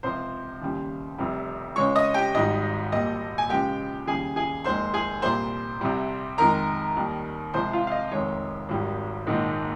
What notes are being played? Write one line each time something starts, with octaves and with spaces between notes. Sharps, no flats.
C#2 C3 F3 C5 C6
D#2 C#3 G3
F1 F2 C3 G3
C#2 C#3 G#3 C#5 C#6
D#5 D#6
G4 G5
G#1 G#2 G3 D#5
A#1 A#2 G3 D#5
G#5
C#2 C#3 F3 G#3 G4 G5
D#2 C#3 G3 G#4 G#5
G#4 G#5
F1 D#2 D#3 G#3 C5 C6
G#4 G#5
C2 A#2 G3 C5 C6
C2 C3 G3
F2 D#3 G#3 A#4 A#5
D#2 D#3 G3
C2 C3 F3 G#3 C5 C6
F4 F5
F5
D#5
F1 F2 D#3 G#3 C#5
G#1 G#2 D#3 G3
A#1 G#2 D#3 G#3